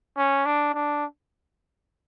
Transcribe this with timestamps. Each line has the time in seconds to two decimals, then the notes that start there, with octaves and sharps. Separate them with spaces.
0.17 C#4
0.46 D4
0.74 D4